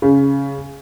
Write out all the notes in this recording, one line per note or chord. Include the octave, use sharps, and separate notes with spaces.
C#3